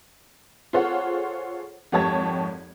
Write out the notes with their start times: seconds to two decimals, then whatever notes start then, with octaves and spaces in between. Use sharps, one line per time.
0.73 F4 G#4 A4 C5 C#5 F#5
1.92 G#1 F2 G4 C#5 A5 G#6